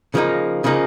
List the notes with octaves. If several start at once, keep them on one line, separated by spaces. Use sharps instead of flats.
C#3 F3 A#3 D#4
C#3 F3 A#3 D#4